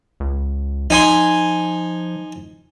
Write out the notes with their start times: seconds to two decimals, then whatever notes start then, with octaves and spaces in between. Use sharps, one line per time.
0.20 C#2
0.90 F3 D#4 G#5 C6